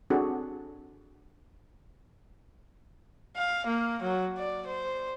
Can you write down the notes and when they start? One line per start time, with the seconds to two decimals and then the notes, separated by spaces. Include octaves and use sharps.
0.10 C4 D4 F#4 G#4 A4
3.37 F5
3.67 A#3
4.02 F#3
4.38 D5
4.67 C5